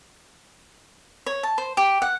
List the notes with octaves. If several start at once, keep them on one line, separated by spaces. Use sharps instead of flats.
C#5
A5
C5
G4
F#5